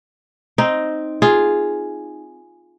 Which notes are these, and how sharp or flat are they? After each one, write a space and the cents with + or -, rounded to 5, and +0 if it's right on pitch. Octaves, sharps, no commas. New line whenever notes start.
C4 +0 D#4 +0
F4 +0 G#4 +0